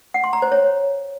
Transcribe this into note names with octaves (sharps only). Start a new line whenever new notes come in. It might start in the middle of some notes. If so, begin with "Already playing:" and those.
F#5
C6
A#5
C5
C#5